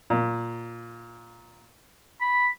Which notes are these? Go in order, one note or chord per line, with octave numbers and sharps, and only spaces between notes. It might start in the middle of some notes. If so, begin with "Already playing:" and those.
A#2
B5